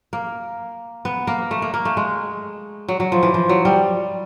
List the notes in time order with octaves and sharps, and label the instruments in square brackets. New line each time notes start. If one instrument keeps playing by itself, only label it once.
[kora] A#3
B3
A#3
A3
A#3
A#3
A3
G#3
F#3
F#3
F3
E3
F3
F#3
G3